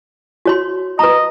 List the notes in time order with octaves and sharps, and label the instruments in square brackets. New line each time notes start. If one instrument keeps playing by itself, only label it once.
[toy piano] F#4 C#5 C6
[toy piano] B4 A#5 [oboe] D#5